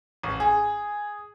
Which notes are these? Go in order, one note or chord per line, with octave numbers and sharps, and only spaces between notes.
A1
G#4